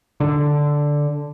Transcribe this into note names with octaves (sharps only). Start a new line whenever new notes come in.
D3